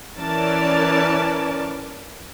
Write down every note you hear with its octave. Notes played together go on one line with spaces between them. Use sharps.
E3 C#4 A#4 D5 A5